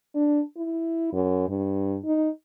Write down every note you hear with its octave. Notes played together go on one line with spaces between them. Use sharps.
D4
E4
F#2
G2
D#4